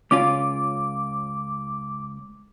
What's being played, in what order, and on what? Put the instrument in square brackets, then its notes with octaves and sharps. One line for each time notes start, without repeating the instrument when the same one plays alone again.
[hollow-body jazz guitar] C#2 C#4 F4 [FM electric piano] D6